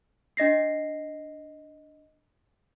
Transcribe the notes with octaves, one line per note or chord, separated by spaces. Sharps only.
D4 D#5 A#6 C7